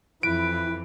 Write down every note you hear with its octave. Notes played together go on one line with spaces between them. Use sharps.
F2 E3 E4 B4 D7